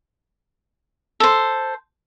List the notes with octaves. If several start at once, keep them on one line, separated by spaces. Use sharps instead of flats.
A4 C5